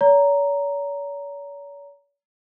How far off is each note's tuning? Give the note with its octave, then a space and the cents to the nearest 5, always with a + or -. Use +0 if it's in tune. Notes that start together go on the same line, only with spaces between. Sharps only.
C#5 +45 A#5 +0